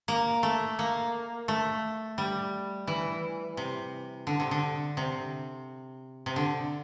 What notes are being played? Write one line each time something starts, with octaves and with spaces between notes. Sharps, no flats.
A#3
A3
A#3
A3
G3
E3
C3
D3
C3
D3
C3
C3
D3